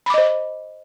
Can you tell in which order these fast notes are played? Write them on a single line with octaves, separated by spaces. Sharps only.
B5 D6 D#5 C5